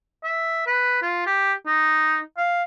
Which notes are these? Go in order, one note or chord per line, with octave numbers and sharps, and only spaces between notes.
E5
B4
F4
G4
D#4
F5